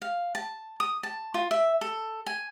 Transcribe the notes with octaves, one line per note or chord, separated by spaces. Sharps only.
F5
A5
D#6
A5
F4
E5
A4
G#5